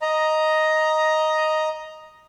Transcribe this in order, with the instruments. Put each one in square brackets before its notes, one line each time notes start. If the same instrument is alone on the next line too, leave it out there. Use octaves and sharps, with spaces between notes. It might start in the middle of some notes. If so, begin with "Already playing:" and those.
[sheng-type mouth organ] D#5 A#5